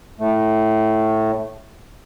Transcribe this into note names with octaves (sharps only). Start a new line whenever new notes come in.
A2 A3